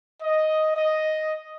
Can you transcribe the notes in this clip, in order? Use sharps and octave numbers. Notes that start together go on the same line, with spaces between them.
D#5
D#5